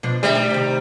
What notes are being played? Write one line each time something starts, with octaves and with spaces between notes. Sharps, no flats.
B2 F3 D4
D2 G3 D4 E5
D#4
C3 D#3